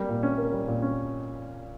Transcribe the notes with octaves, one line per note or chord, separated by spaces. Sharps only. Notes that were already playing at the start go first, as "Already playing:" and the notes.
Already playing: G3 A#3
A#2
C#4
A#3
G3
A#2
C#4